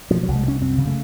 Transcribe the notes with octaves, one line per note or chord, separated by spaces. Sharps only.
B2 F3
F#3
C2
G#3
C2 C#4
F#2 C4
C#3
A3